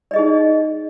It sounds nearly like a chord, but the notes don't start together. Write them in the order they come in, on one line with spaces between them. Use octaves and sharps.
D5 D#5 G#4 D#4